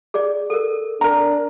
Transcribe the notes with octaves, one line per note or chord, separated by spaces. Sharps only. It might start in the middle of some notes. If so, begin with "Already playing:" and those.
G#4 D5
A4 A#4
D4 A#4 G#5 A#5